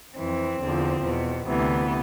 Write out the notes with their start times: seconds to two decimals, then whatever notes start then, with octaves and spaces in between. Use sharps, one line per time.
0.17 F2 E3 C4
0.61 E2 D3 F3
1.04 E2 B2
1.47 D2 C3 E3 B3